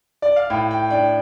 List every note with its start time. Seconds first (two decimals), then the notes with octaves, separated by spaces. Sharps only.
0.22 D5
0.36 F5
0.50 A2 G5
0.71 G5
0.90 D4 G5